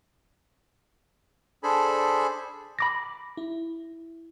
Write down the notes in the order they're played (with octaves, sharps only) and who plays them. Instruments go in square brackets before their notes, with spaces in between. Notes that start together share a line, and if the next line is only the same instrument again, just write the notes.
[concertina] D4 G#4 A4 C5 G#5 B5
[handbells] B5 D6 A#6
[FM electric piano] E4